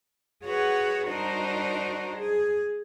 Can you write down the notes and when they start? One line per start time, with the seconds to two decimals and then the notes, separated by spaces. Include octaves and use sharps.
0.44 F#4 G#4 B4 C#5 F#5
1.07 G3 D4 D#4 F#4 A#4 C5
2.17 G#4